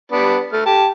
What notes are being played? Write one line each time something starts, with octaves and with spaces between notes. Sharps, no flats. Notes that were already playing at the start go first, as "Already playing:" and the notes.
G3 B3 D4
A3 F6
G4 A5